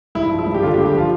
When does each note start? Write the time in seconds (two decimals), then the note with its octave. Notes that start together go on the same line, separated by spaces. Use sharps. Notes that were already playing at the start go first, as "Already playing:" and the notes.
0.15 G2 E4
0.31 F3
0.39 E4
0.46 G2
0.54 G4
0.62 D3 F4
0.74 G4
0.78 G2
0.86 G4
0.94 F3 F4